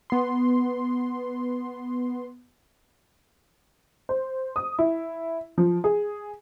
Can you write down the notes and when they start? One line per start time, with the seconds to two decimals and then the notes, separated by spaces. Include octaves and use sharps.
0.10 B3 C6
4.09 C5
4.56 D#6
4.79 E4
5.58 F3
5.84 G#4